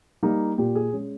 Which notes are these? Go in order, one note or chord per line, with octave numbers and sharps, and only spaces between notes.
G3 A#3 D#4
A#2 G4
G#4
G#3 C#4